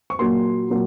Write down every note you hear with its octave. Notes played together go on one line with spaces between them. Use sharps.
C#6
A#2 F#3 A#3 C6
A#2 F#3 A#3